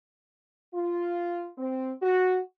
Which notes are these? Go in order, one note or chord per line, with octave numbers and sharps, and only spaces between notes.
F4
C4
F#4